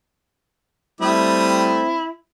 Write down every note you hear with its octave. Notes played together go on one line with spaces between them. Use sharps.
G3 A3 C4 E4 D#6